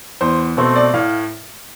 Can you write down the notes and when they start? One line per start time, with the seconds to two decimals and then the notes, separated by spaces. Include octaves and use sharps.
0.21 E2 C5
0.57 B2 A3 C4 C5
0.76 D5
0.93 A2 F5